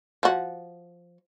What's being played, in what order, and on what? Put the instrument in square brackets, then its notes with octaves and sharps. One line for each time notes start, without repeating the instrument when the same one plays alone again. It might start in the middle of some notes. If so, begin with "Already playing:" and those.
[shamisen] F3 F#4